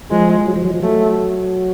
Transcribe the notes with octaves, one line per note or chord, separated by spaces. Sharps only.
F3 G#3
F#3
F3
F#3
F3
F#3 A3